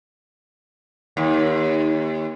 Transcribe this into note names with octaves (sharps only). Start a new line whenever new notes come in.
D#2